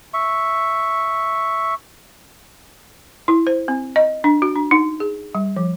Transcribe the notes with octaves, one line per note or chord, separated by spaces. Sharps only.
E5 C#6
E4
C5
C4
D#5
D4
F#4
D4
D#4
G#4
G3
F3